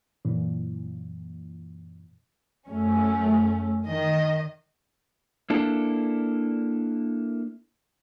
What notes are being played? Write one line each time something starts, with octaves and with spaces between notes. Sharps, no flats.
F#2 A#2 E3
F#2 A3 C#4
D#3 D#5
A#3 D4 E4 A4